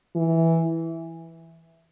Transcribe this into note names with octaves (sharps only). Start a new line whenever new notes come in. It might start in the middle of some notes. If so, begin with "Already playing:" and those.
E3